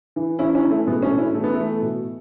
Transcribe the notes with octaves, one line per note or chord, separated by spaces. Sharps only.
E3
E3 C#4 E4
C#4 E4
E3
A3
B2 G#3 B3
A3 C#4
B2
C#4 E4
E3 A3
B3
E3 A3
B2